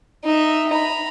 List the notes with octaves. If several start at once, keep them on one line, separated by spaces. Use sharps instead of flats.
D#4 E5
A#5 B5